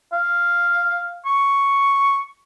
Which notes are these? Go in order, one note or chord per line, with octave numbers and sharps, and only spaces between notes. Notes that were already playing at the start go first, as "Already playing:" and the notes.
F5
C#6